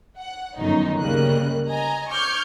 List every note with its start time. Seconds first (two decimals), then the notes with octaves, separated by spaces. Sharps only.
0.17 F#5
0.56 G1 F#2 D#3 D#4
0.98 D2 C#3 G3 A#3 D#5 F#6
1.67 D#5 G#5 A#5
2.10 C#6 D6 F6 G6 G#6